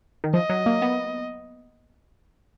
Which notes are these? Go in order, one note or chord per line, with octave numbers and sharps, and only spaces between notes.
D#3
F3 D#5
F#3
A#3
B3